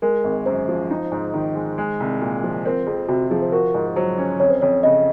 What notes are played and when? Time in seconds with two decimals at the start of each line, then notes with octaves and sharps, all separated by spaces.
0.02 G#3 A#4
0.24 G#1
0.46 F#2 C5
0.68 F3
0.91 D#4
1.12 G#2
1.34 D#3
1.55 G#3
1.78 G#3
2.00 C2
2.21 A#2
2.43 F3
2.65 C4 A#4
2.87 F2 G#4
3.08 C3 F#4
3.31 F3 G#4
3.42 C5
3.52 F#4 A#4
3.74 G#2
3.96 F#3 C5
4.18 C#4
4.40 F2 C#5
4.50 C5
4.61 F2 C#5
4.83 C#3 D#5